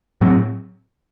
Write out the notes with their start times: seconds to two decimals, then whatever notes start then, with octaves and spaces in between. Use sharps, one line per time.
0.21 A2 F#3 C4